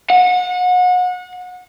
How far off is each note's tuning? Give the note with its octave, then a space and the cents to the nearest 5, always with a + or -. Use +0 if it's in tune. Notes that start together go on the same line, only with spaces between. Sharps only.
F#5 -30